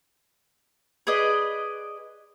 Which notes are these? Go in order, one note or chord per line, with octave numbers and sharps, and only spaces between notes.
G#4 B4 D5 D#5